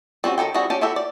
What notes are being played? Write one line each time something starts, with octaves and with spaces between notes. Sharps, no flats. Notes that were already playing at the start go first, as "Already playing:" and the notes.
G3 C4 C#4 F#4
D#3 F3 A4 G5
G3 C4 E4 F#4 G#4
C#4 G4 D5 A5
E4 F#4 G4 A4 E5
D5